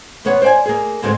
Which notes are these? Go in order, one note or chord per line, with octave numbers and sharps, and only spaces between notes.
E2 C3 B3 C#5 F#5
C5 D5 G5 G#5
A#3 G#4
D2 G#2 D3 G#3 A3 C4